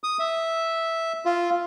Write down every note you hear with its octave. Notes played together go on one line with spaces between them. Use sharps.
D#6
E5
F4